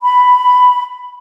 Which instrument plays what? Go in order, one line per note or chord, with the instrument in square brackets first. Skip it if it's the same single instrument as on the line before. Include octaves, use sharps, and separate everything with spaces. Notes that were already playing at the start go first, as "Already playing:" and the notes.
[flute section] B5